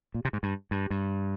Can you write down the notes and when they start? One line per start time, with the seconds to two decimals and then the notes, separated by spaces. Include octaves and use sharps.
0.14 A#2
0.25 C3
0.33 G#2
0.43 G2
0.71 G2
0.90 G2